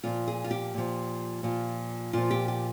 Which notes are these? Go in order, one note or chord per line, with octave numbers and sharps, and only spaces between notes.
A#2 F3 F4
G#4
F4
G4
A#2 F3
A#2 F3
A#2 F3 F4
G4
G4